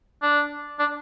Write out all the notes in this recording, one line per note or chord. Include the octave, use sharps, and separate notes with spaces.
D4
D4